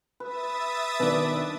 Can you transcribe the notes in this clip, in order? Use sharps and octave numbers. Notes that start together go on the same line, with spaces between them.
B4 E5 D#6 A6
B2 D#3 D4 B4 D5 A5 B5